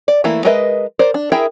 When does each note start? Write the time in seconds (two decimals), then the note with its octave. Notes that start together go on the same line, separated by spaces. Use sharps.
0.08 D5
0.24 E3 A3 A#3 E4
0.45 G#3 A#4 B4 D#5 E5
0.99 A#4 C5 D5
1.14 D4
1.32 E4 G#4 A#4 E5 G5